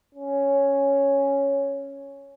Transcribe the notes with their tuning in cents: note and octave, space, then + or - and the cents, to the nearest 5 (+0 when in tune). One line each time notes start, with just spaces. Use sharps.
C#4 +0